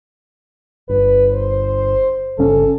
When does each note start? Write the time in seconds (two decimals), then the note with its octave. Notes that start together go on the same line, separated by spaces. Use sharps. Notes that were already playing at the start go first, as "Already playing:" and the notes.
0.89 G1 B4
1.33 C5
2.38 G1 C#3 C#4 A4